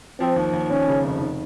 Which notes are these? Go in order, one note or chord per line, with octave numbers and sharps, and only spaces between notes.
F3 C4
D#2
D#2
D#2 C#4
C#3
F1
D#3